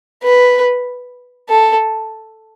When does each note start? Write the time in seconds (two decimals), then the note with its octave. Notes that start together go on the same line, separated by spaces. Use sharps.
0.23 B4
1.49 A4